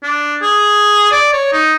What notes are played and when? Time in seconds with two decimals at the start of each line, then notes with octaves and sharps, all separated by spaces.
0.03 D4
0.42 G#4
1.12 D5
1.33 C#5
1.52 D#4